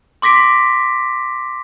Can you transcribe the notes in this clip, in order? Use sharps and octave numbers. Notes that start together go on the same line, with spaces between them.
C6 D6 A#6 B6 D7